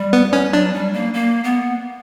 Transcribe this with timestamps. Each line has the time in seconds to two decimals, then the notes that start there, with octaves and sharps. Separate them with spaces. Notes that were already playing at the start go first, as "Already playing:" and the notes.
Already playing: G3
0.13 B3
0.33 C#4
0.53 F#3 D4
0.74 G3
0.93 A#3
1.14 A#3
1.44 B3